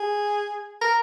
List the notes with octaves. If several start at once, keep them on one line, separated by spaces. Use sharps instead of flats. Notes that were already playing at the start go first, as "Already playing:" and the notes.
Already playing: G#4
A#4